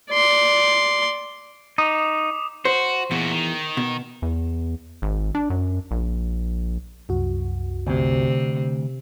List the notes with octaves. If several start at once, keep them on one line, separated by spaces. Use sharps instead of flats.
D5 C6
D#4 D6 D#6
F#4 C5
E2 A#2 F#4
D#3
B2
E2
G#1
D4
F#2
A#1
C2 F#2 F#4
D2 C3